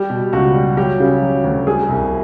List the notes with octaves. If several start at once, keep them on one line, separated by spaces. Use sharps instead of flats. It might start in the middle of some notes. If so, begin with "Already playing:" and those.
Already playing: G3 G4
B2
C#2 F#4
G3
F#3 G4
C#3
F#3
D2
G3 G#4
C2